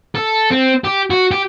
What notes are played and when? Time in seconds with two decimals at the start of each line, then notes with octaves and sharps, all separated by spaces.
0.15 A4
0.51 C4
0.84 G4
1.11 F#4
1.31 G4